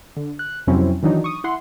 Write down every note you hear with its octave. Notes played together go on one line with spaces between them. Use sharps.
D3
F#6
F2 C3 F#3 C4 C#4 E4
D#3 E3 F#3 D4 D#4
C#6 D#6
E4 F#5 C6